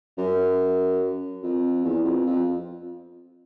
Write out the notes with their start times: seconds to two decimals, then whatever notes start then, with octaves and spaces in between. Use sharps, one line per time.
0.18 F#2
1.43 F2
1.84 E2
2.04 F2
2.26 F2